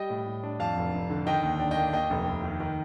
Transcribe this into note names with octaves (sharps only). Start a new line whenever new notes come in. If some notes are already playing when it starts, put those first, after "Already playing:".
Already playing: G3 D#5 G5
A2
A2
D4
F2 F5 A5
F1
F1
D3
D#3 D#5 G5
D#2
D4
D#5 G5
A#3
D#2 D#5 G5
F1
F1
D#3
D#3